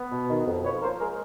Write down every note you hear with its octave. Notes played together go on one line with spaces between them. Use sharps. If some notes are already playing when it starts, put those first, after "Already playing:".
Already playing: B3
B2
D#3
F2
F3 B4 C#5
A#3 A#4 C5
G#3 G#4 A#4